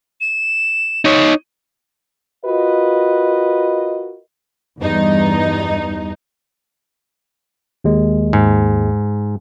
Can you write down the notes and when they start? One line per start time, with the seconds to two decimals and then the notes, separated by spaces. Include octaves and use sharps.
0.21 E7
1.05 D#4 C#5
2.45 F4 F#4 A#4 B4 D#5
4.79 E2 G2 D#4
7.84 D#2 G#3
8.33 G#2